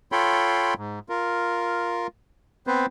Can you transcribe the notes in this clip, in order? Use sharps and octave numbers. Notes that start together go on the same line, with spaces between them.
F4 A4 C#5 G5 B5 C6
G#2
F4 A#4
B3 C4 B4 C5